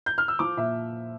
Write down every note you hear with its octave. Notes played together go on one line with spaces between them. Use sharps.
G6
F6
E6
F3 D6
A#2 E5